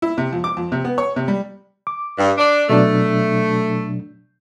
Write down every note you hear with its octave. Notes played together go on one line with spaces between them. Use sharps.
E4
C3
F2
D6
F2
C3
B3
C#5
C3
G3
D6
G2
D4
B2 F#3 A3 D4